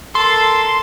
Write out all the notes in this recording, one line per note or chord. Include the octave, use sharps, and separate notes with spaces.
A4 A#4 C6